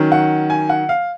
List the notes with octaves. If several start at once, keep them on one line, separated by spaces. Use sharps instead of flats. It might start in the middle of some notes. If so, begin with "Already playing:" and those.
Already playing: D#3 F#3 C#4
F#5
G#5
F#5
F5